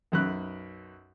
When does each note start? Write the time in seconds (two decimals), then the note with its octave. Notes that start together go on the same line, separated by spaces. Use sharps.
0.12 B1 F#2 F#6